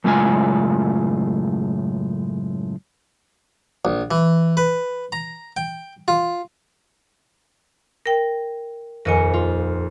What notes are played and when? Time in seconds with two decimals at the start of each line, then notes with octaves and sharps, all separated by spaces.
0.04 F#2 A2 C#3 G#3 F4 G#5
3.85 A#1
4.11 E3
4.57 B4
5.12 A#5
5.57 G5
6.08 F4
8.06 A#4 G5
9.05 D#1 F2 A#4 D#5 G#5 C#7
9.34 F4